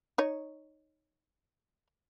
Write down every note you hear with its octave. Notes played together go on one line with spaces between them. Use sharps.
D#4 C#5